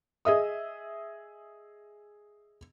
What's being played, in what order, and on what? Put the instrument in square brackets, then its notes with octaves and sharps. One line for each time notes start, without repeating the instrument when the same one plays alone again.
[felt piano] G#4 D#5 E5 D#6